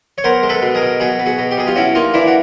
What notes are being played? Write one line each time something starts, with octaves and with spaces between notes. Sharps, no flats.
C#5
B3 A#4 C5
G#3
A4 B4
B2
G#4 A#4
B2
B2 F#4 G#4
B3
F#4 G#4
B2
G4
B2 G#4
F4 G4
C#4 E4 F#4
A#3 D#4 F4
E3 D4 E4
F#4